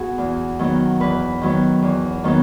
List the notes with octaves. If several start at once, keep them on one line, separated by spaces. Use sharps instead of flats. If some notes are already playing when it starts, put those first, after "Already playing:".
Already playing: B3 F#4 G#4
E2
D#3 F#3 B3
E2 B4
D#3 F#3 B3
E2
D#3 F#3 B3